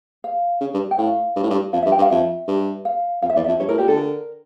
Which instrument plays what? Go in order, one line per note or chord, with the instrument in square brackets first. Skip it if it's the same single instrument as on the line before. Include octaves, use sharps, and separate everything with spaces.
[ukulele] F5
[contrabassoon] C#3
G2
[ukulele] G5
[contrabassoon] A2 [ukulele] F5
[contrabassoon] G2
A2
G2
[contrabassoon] F2 [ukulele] F5
[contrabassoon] G2 [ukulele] E5
[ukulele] G5
[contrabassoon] G2
[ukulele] F5
[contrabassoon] F2 [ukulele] E5
[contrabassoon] G2
[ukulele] F5
[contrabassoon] F2 [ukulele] F5
[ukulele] E5
[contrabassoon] E2 [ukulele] D5
[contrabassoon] F2 [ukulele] E5
[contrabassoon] G2 [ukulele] C#5
[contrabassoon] A2 [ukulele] A#4
[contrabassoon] A#2 [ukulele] G4
[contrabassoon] D3 [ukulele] A4
[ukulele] A#4